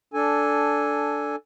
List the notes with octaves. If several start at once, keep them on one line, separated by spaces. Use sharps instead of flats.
D4 A4 G#5